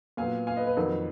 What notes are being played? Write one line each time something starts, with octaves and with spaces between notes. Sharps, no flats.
A#2 F#3 B3 F5 G#5
F5 G#5
B4 D#5
B4
F2 D#3 F#3 A#3 D#4